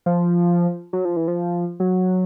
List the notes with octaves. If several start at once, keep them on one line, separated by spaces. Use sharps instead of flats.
F3
F#3
F3
E3
F3
F#3